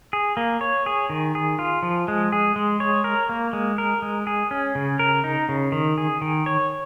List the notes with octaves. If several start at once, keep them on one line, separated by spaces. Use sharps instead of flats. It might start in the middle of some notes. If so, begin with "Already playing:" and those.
G#4
A#3
C#5
G#4
D#3
G#4
F4
F3
G#3
G#4
G#3
C#5
A#4
A#3
G#3
A#4
G#3
G#4
C#4
C#3
A#4
D#4
C#3
D#3
G#4
D#3
C#5